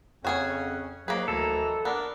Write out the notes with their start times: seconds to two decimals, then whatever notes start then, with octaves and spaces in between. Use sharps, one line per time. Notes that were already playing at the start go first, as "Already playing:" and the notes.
0.25 F2 C#3 C#4 F#4 G#4 C#5 F#5
1.08 G#2 F#3 A#3 G#4 B4 D6
1.28 D2 D#3 E3 A4 A#5
1.85 B3 D4 A#4